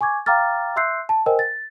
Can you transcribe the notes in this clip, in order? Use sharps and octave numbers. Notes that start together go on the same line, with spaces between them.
G#5 C#6 D6 G#6
F5 G5 A#5 D6 F6 A6
E5 C6 E6 F#6 G6 C7
A5
A#4 C5 D#5 G5 G#5
A6